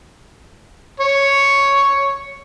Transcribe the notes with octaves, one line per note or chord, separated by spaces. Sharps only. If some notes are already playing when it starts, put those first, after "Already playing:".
C#5